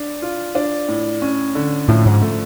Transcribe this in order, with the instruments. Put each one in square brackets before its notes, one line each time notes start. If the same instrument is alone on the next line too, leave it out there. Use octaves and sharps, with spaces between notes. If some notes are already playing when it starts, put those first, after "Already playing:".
Already playing: [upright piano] D4
F4
D4
A2
C#4
D3
[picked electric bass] A2 [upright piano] F3
[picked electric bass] G#2
[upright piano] A3